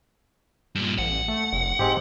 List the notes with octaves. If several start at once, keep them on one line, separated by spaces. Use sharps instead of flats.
G2 A#2
A1 F#5
A3
F1
G#2 G#3 C4 G4